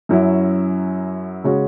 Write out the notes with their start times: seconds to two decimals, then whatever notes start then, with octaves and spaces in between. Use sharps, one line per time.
0.09 F#2 F#3 C#4 E4
1.44 C#3 G#3 C#4 F#4